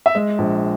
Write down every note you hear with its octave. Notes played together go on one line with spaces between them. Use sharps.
E5
G#3 D#5
A#1